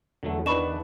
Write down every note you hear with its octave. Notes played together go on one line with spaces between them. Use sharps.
E2 D3 F#3 A3
D#3 B3 D4 B5 C#6 E7